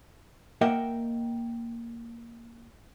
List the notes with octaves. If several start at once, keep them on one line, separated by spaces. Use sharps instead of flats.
A#3 A#4 D#5 E5 F#5 G5